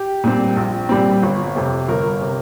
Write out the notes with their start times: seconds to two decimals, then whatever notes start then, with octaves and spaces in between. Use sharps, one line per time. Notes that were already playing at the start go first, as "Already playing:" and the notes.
Already playing: G4
0.24 A#2 G3 C4
0.56 A#1
0.89 A#2 G3 C4
1.23 G1
1.56 F2 C3
1.88 G1 A#4
2.21 C3